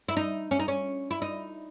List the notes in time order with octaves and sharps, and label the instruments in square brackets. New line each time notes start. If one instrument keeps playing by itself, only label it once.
[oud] E4
D#4
C#4
D#4
C#4
E4
D#4